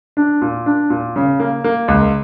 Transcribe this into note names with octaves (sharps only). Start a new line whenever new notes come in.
D4
A#2
D4
A#2
C#3
A#3
A#3
C#2